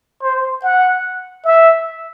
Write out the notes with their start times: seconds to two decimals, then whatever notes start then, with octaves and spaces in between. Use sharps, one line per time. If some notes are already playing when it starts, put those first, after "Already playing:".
0.23 C5
0.63 F#5
1.45 E5